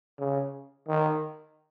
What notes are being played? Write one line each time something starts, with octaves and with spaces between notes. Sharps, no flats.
C#3
D#3